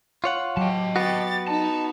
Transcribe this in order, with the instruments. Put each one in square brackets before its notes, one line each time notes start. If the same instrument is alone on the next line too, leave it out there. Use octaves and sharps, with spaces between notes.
[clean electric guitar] F4 C#5 F#5
[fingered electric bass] F#3 [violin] G4 [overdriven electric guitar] D#5 A5
[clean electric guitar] B3 F#4 [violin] G4 A6
[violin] D#4 [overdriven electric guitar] A5